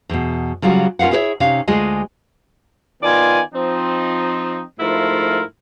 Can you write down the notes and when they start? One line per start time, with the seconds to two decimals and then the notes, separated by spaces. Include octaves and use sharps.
0.09 E2 B2
0.62 C#3 F#3 G3 F4 F#4
0.99 C#4 F4 A#4 F5 F#5
1.11 E4 G#4 A#4 B4 C#5 E5
1.40 C3 C#4 D#4 F5
1.67 D2 G#3 F4 G#4 D#5 G#5
3.03 D#3 B3 F4 D5 G#5
3.54 F3 C4 D#4
4.80 G#2 F3 A3 E4 F4 A#4